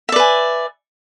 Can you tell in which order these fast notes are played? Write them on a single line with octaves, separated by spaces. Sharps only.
E5 D5 B4 G#5